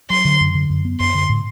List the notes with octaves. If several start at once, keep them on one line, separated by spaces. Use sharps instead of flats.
F#3 C6
D3
F#2
D3
F#2
B3
F#2 C6
D3
A2